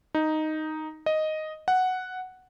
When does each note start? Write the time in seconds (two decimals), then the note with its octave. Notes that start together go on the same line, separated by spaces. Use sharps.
0.15 D#4
1.06 D#5
1.68 F#5